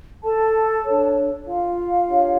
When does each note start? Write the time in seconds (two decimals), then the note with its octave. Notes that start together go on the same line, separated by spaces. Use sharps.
0.23 A4 A5
0.85 D4 A4 C#5
1.47 F4 F5
2.08 D4 G4 C#5